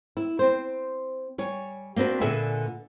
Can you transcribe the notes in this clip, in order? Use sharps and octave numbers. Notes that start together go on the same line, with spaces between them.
E4
C4 C5
G3 C#5 G#5
A#3 C4 D4 F#4 B4
A#2 D3 G#4 B4 E5 G#5